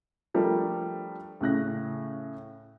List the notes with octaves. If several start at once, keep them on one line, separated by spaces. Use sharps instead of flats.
F3 G3 A3 D4 A#4
A2 C#3 F#6 A#6